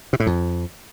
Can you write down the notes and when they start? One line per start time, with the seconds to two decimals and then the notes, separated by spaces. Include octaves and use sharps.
0.13 C3
0.20 A2
0.26 F2